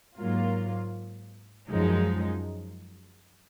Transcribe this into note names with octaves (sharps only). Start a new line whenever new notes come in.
G#2 F#3 A#3 F4
F#2 F3 G#3 D#4